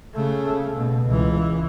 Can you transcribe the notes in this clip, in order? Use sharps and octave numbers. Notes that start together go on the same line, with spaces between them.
C#3 A3
B2
C#2 E3